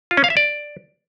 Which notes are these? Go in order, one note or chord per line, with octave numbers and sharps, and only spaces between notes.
F4
C#4
F5
E5
D5